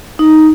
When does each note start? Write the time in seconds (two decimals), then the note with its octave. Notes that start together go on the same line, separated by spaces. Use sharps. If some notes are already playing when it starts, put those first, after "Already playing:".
0.19 D#4